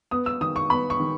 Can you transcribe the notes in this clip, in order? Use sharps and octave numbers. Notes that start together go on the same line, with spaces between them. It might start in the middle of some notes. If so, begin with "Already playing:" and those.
B3 D#6
E6
D#3 D#6
C#6
B3 B5
C#6
D#3